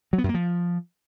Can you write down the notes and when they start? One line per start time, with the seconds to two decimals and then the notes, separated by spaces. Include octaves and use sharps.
0.13 F#3
0.18 B3
0.24 F#2
0.29 A#3
0.34 F3